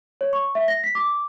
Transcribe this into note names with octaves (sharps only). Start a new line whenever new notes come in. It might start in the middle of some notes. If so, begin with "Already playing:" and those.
C#5
C#6
E5
A#6
B6
D6